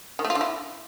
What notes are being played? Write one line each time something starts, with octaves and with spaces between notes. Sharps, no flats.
D#3
A3
F4
D3
E4